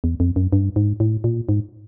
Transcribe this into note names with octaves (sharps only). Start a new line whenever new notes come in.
E2
F2
F#2
G2
G#2
A2
A#2
G#2